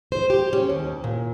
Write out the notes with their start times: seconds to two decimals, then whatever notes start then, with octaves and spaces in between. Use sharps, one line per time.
0.12 C5
0.30 G4
0.53 C#4
0.70 D#2
1.04 A#2